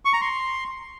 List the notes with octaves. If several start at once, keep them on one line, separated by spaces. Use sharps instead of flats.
C#6
A#5
C6